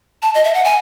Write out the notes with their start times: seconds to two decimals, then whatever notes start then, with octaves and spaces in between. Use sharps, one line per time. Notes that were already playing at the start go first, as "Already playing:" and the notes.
0.22 A5
0.34 D#5
0.44 E5
0.54 F#5
0.64 G#5